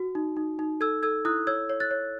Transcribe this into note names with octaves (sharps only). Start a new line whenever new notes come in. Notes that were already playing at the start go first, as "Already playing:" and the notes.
Already playing: F#4
D#4
D#4
D#4
A4 E6 G#6
A4 E6 G#6
E4 D#6 F#6
C#5 E6 G#6
C#5
F#6 A6
C#5